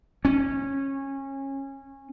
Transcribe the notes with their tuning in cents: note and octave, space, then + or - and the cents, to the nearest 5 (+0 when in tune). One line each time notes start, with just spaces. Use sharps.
C#4 -20